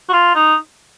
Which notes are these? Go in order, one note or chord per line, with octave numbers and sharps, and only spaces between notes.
F#4
F4
D#4